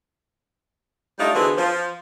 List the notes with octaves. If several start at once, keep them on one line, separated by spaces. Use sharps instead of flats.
G3 A3 D4 D#4 F4
D3 E3 B3 C4 F#4 G#4
F3